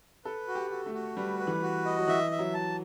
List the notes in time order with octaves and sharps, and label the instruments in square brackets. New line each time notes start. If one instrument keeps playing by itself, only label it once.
[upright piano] A4 [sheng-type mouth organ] B4
[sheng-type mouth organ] F#4
[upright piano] G4
[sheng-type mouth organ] F#4
[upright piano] A3
[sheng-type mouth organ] F#4
[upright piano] G3 [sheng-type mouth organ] B4
[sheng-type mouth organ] B4
[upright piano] E3
[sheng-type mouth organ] F#4
D#5
[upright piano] F#3
[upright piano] E3 [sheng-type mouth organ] E5
[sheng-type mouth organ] E5
[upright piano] F#3
[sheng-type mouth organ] A5